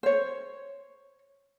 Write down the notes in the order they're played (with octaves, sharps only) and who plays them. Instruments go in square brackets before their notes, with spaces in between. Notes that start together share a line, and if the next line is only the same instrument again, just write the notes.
[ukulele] C5 C#5